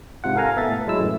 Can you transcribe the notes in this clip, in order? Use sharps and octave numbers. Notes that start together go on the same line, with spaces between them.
G#2 C3 F4 F#5
A4 A#4 F5 G#5 A#5
B3 A4 E5 A6
A2
F#3 G#3 E4 E6
F#2 A2 E3 A3